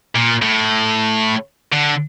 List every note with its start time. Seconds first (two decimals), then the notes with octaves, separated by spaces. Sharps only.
0.16 A#2
0.42 A2
1.73 D3